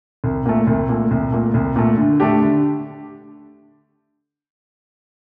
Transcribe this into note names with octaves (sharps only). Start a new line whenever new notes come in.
C2
A#2 A3
C2
A#2 A3
C2
A#2 A3
C2
A#2 A3
D3
A3 D4 G4
D3